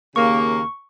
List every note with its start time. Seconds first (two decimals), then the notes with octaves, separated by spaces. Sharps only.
0.16 D#2 C#3 A#3 C#6